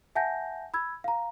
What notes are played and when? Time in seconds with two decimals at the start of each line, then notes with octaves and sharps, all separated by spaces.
0.15 E5 F#5 G#5 A5 G6 A#6
0.74 B5 E6 G#6
1.04 F5 A#5